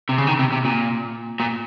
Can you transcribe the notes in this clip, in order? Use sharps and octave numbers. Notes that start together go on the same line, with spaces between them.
C3
C#3
D#3
C3
C3
A#2
A#2